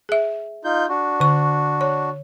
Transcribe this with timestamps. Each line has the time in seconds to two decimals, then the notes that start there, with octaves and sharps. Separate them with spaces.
0.09 G#4 E5
0.64 D#4 F4 G6
0.89 D4 F#4
1.20 D3 C#6
1.81 C#5